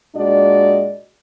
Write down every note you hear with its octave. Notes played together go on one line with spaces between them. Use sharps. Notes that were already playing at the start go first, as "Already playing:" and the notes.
A#2 G#3 D4 F#4 D5 D#5